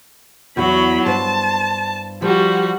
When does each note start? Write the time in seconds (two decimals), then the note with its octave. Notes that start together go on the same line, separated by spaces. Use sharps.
0.57 E2 F#3 F#4 B5
1.06 G2 C5 A5
2.22 F3 G3 F#4